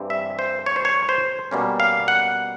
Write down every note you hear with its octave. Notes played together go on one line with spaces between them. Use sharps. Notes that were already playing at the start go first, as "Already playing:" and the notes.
Already playing: G2 E3 G3 C4 E4
E5
C5
C#5
C5
C#5
C5
B2 G3 A#3 C#4
F5
F#5